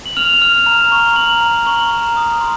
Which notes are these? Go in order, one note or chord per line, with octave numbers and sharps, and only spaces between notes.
F#7
F6 F7
F6
A#5
C#6
A#5 F#7
A#5
C#6 F#7
A#5
D#6
C6